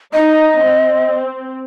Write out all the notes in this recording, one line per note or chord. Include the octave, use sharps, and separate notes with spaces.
D#4 D#5
C4